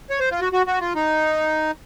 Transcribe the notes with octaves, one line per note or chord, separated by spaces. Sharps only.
C#5
C5
F4
F#4
F#4
F#4
F4
D#4